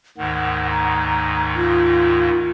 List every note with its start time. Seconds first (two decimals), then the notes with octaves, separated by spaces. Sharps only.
0.18 D2 G#2 D#3 F#5
0.71 A#5
1.55 F4